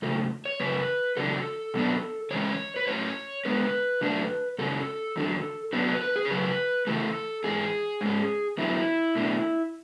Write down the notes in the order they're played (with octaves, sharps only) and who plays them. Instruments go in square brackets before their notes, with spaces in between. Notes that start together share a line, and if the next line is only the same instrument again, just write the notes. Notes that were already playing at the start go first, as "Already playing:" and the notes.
[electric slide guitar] E2 C#3 F#3 A3 A4
C#5
F#2 C#3 B4
E2 C#3 F#3 D4 A4
B2 F#3 B3 D4
C#3 E3 G#3 C#4 C#5
B4
A2 F#3 C#4 C#5
D3 G#3 B3 B4
F#2 D3 F#3 A3 D4
F#2 C#3 F#3 C#4 A4
E2 D3 F#3
D3 F#3 B3 D4 B4
B4
B4
G#4
C#5
F#2 C#3 F#3 B4
C#3 E3 A3 A4
G#2 E3 G#3 G#4
G#2 G#3 C#4
E2 D3 F#3 B3 E4
B2 A3 D4